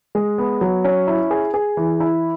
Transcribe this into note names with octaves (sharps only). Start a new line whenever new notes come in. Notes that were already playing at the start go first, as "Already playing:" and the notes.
G#3
B3
F#3
C#4
E4
G#4
G#4
E3
E4